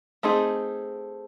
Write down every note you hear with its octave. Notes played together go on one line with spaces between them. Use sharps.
A3 C4 D#4 G#4